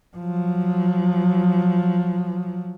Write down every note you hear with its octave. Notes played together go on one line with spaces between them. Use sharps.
F3 F#3